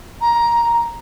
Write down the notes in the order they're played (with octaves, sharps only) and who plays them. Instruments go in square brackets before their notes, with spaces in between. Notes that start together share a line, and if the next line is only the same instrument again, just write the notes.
[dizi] A#5